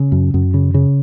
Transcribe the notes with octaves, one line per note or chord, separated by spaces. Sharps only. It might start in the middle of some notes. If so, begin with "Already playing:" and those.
Already playing: C#3 C#4
F#2
F#2
C#3
C#3